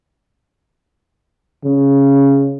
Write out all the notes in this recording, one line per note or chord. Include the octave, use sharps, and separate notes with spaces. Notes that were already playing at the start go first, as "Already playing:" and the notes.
C#3